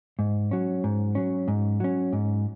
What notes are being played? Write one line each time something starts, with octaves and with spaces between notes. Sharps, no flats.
G#2
F#3 C#4
G#2
F#3 C#4
G#2
F#3 C#4
G#2